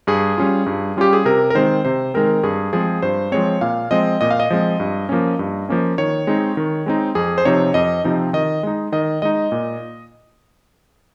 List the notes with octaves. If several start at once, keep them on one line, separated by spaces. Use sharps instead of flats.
G2 G#4
G3 C#4 F4
G2
G3 C#4 F4 G4
G#4
C3 A#4
A#4
D#3 G#3 C4 C5
C3 C5
D#3 G#3 C4 A#4
G2 G#4
F3 G#3 C4 G#4
G2 C5
F3 G#3 C4 C#5
A#2 F5
F3 G#3 C4 D#5
A#2 D#5
F5
D#5
F3 G#3 C4
G2
F3 A#3 C#4
G2
F3 A#3 C#4
D#3 C#5
G#3 C4 D#4
D#3
G#3 C4 D#4
F2 G#4
C5
C3 F3 C4 D#4 C#5
F2 D#5
C3 F3 C4 D#4
D#3 D#5
G#3 D#4
D#3 D#5
G#3 D#4 D#5
A#2